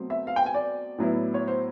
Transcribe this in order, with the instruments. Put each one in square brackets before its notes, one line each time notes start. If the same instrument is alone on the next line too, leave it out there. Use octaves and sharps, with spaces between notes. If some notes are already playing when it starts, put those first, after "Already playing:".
Already playing: [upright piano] B2 F#3 A3 C4
E5
F5
G5
G#5
D5
A2 F#3 B3 E4
C#5
C5